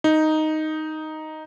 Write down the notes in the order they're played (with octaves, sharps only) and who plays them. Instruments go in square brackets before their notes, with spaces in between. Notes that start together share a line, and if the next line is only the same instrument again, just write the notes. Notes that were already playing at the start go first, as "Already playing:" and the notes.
[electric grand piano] D#4